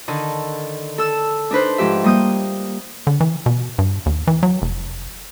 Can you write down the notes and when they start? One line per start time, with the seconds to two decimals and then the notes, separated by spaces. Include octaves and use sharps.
0.08 D3 D#3
0.98 A4 E6
1.51 D4 D#4 B4 C5
1.78 G#2 F3 G4 E5
2.04 G3 A#3 D#6 G6
3.07 D3
3.20 E3
3.46 B2
3.78 G2
4.06 D#2
4.27 E3
4.43 F#3
4.62 F1